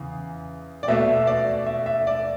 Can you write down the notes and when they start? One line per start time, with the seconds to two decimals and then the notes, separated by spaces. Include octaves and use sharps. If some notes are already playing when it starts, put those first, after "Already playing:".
Already playing: E2 C#3
0.83 D5
0.88 B2 A3 E5
1.27 D5
1.66 E5
1.86 E5
2.07 D5